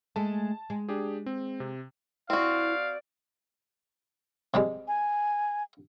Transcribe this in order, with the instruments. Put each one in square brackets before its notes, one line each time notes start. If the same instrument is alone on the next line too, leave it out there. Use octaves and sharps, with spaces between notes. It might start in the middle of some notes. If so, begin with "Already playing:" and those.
[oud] G#3 A3 [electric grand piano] A5
[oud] G#3
[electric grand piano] D4 G4 G#4
C4
C3
[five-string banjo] C4 F#4 [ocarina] E4 [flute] D5 [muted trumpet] F5
[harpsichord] C3 G3 G#3
[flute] G#5